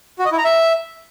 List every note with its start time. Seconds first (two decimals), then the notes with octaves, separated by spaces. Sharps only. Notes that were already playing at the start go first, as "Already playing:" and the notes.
0.19 F#4
0.25 D#5
0.32 E4
0.38 A#5
0.45 E5